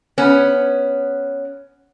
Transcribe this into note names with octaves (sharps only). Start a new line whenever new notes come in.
B3 C#4